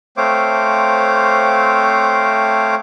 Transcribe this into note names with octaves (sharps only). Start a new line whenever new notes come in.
A3 C4 C5 C#5 F5 D6